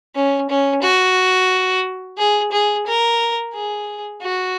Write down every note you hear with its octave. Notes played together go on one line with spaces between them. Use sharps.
C#4
C#4
F#4
G#4
G#4
A#4
G#4
F#4